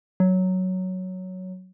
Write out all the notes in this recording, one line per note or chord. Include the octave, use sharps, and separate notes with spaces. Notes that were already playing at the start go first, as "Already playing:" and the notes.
F#3